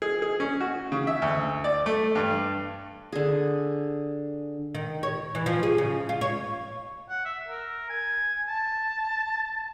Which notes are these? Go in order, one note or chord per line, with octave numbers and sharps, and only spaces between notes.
G#4
G#4
C#4
F#4
C#3
E5
D2
D5
A3
G2
D3 G#4
D#3
C#5
E3
F3
G#4
C#3
F4
C#5
F#5
E5
A#4
G#5
A5